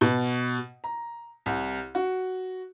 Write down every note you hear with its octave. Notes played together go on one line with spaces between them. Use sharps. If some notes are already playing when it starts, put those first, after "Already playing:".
B2
A#5
C2
F#4